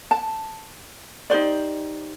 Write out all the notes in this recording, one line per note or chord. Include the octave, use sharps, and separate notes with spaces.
A5
D#4 G4 C5 D5